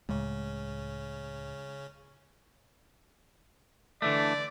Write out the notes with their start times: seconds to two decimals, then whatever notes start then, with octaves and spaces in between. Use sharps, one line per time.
0.09 C#2 A2 C#3 G#3 C#4
4.02 D3 E3 A3 D5